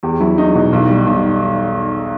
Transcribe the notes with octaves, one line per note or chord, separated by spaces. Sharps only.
E2 G4
F#3 E4
E2 D#4
B2
B1
G3
B1